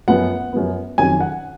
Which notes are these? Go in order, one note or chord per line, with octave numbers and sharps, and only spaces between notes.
F#2 F3 B3 F#5
F#2 F3 B3
F2 D#3 F#3 C#4 G#5
F#5